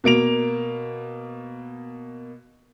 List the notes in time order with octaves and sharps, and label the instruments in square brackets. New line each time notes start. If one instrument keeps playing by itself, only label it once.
[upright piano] B2 A#3 D7 F7